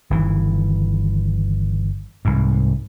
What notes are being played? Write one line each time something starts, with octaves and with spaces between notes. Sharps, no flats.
G1 D#3 E3
C2 G#2